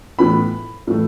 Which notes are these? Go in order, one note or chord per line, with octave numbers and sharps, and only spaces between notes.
A2 E3 B3 B5
A2 E3 A3